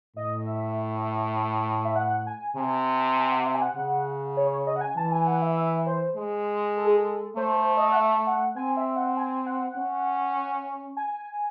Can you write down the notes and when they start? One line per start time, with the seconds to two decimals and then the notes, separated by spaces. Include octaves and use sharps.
0.16 A2 D#5
0.45 E5
1.85 E5
1.96 F#5
2.27 G#5
2.56 C3 G#5
3.16 G#5
3.31 F#5
3.46 E5
3.54 G#5
3.62 F#5
3.76 C#3
4.37 C#5
4.52 C#5
4.67 D#5
4.76 F#5
4.81 G#5
4.97 E3 A5
5.12 G#5
5.27 F#5
5.42 E5
5.57 E5
5.86 C5
6.17 G#3
6.77 A4
6.86 G#4
6.97 A4
7.37 A3 C5
7.56 C5
7.77 D#5
7.92 F#5
7.97 E5
8.27 F#5
8.56 C4 G#5
8.77 E5
8.96 F#5
9.17 G#5
9.46 F#5
9.77 C#4
10.97 G#5